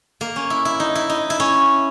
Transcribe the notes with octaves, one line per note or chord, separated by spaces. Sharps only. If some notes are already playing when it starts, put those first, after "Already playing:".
A#3
C#4
E4
E4
D#4
E4
D#4
E4
C#4